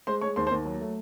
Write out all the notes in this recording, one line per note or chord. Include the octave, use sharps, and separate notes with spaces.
G#3 C5 C6
G#3 C#5 C#6
D#2 C5 C6
C5 C6
D#2
F#3
A3